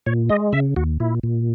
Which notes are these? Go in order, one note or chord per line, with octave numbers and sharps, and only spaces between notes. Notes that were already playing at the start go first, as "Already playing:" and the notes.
A#2 C#5
G#3 D#5
C#3 E5
D#2 F#4
A#2 E4
A#2